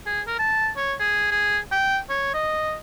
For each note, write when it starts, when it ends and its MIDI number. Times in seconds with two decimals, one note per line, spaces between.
0.06 0.21 68
0.27 0.38 70
0.39 0.69 81
0.77 0.94 73
1.00 1.28 68
1.31 1.59 68
1.72 1.98 79
2.10 2.33 73
2.34 2.75 75